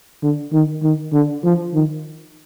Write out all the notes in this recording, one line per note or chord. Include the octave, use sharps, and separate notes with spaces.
D3
D#3
D#3
D3
F3
D#3